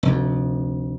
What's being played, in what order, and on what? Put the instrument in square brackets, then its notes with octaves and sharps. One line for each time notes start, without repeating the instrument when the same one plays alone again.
[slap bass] F1 D2